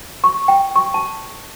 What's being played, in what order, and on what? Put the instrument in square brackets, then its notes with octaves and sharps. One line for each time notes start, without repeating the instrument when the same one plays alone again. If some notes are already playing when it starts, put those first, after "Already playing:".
[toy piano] C#6
G5
C#6
A5